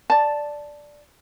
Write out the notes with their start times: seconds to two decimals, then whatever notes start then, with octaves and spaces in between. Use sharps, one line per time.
0.10 D5 A5